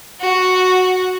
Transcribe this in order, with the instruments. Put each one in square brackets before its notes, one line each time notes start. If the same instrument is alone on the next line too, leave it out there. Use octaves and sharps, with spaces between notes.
[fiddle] F#4